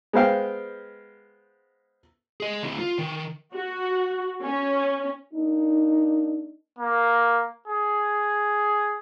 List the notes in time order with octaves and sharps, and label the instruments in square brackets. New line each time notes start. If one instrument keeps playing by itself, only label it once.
[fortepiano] G#3 B3 C5 F5 G5
[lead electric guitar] G#4 D#5
D2 E4
F4
D#3
[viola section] F#4
C#4
[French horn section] A#3 D4 D#4
[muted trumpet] A#3
G#4